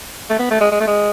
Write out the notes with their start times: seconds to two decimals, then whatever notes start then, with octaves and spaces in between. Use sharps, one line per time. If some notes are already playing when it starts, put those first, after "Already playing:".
0.30 A3
0.39 B3
0.50 A3
0.60 G#3
0.72 G#3
0.80 A3
0.87 G#3